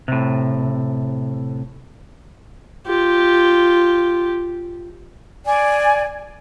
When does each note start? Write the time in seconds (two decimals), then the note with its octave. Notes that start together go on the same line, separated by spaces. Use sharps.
0.08 A2 C3
2.87 F4 G4
5.45 D5 G#5